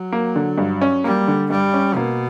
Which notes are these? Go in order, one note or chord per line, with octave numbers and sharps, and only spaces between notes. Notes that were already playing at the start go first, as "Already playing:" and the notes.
Already playing: F#3
A#3
D3
G2
C#4
G3 A#3
D3
G2 G3
C#4
B2 A#3